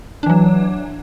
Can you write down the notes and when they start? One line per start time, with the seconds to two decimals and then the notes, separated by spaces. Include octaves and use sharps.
0.23 D4
0.26 E3
0.30 F#3